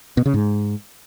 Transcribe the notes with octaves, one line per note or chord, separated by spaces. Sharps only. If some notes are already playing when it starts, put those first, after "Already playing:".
B2
C#3
G#2